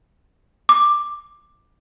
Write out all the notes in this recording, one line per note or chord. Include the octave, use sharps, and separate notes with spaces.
D6